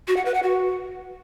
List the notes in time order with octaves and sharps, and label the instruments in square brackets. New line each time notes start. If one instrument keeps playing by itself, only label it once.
[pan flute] F#4
F#5
B4
F#5
F#4